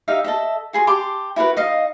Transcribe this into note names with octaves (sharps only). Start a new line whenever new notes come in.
D#4 G4 E5 F5
A4 D#5 E5
F#4 G#4 C6
G4 A5 C6 D6
E4 F#4 A#4 B4
D#4 D#5 F5